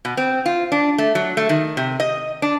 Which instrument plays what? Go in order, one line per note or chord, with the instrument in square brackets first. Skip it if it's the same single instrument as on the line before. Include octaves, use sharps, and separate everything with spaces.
[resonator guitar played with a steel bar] B2
C4
F4
D4
A3
F#3
A3
D#3
C3
D#5
D4